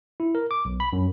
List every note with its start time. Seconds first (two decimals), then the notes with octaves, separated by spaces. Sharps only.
0.20 E4
0.35 A#4
0.51 D6
0.65 B1
0.80 B5
0.93 F#2